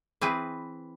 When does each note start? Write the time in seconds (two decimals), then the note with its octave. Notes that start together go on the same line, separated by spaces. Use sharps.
0.21 E3 C4 G#4 B4